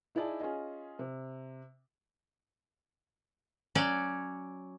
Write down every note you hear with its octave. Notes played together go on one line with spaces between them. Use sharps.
D#4 E4 G#4 D5 D#5 A5
C#4 F4 G#4 D#5
C3
F#3 C#4 D5